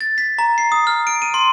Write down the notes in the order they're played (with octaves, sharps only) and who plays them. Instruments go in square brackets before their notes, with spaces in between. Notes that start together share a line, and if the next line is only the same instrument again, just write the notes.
[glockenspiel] A6
B6
A#5
C7
D#6
F6
D7
D#7
C6